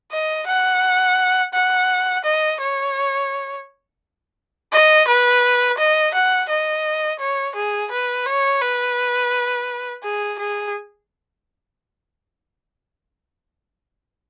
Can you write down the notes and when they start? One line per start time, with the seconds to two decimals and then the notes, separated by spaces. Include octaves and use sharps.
0.12 D#5
0.47 F#5
1.54 F#5
2.24 D#5
2.60 C#5
4.72 D#5
5.07 B4
5.78 D#5
6.14 F#5
6.49 D#5
7.20 C#5
7.55 G#4
7.91 B4
8.26 C#5
8.61 B4
10.03 G#4
10.39 G#4